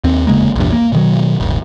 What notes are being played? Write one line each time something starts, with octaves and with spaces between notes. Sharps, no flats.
D#2 C4
F1 C#3 G#3 A#3
A#1 E2 G2
A#3
B2 D#3 F#3
D#1 G#1